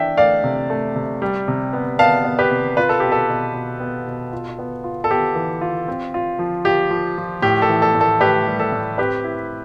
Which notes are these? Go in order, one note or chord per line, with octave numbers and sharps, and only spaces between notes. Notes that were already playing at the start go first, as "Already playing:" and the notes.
Already playing: E3 D4 E5 G5
A3 D5 F5
C3
A3
C3
G3
C3
B3
B3 F5 A5
B3
G4 B4
C3
F4 B4
A4
B2 G4
A4
B2
B2
B3
B2
F4
B3
F4
A4
B3 G4
E3
F4
C4
F4
F3
F4 G4
F3
F3
A2 G4
A4
E3
A4
A2
A4
A2 G4 B4
G3
A4
A2
C4 G4 B4
E4